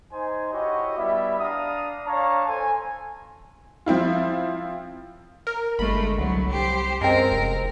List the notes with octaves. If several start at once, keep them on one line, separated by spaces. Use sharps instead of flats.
D#4 C5 G#5
E4 F#4 G4 C#5 D#5
G3 B3 E4 E5
D4 F5 A#5 D#6
D4 C#5 F5 A5 A#5
A4 C5 G#5
F3 C4 E4 F4
A#4
G1 G#3 A3 B5
C2 D3 F#3
G4 C5
F#2 G#3 C4 A#4
F1